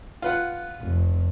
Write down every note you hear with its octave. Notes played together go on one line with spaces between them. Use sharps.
F4 B4 F#5
F1